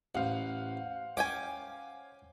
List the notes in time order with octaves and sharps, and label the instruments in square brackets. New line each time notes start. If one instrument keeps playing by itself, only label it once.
[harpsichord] A1 [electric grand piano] C5 F5 F#5
[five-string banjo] C#4 G5 G#5 [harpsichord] D6